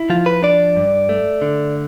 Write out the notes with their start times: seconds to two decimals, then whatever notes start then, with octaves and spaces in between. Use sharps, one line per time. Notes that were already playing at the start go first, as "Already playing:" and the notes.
Already playing: E4
0.10 F3 F4
0.26 B4
0.43 D4 D5
0.76 G2
1.09 A3
1.42 D3